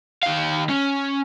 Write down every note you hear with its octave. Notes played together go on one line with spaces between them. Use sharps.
D#3 F5
C#4